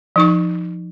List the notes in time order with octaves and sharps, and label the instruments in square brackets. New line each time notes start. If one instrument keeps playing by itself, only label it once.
[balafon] F3 D#4 C#6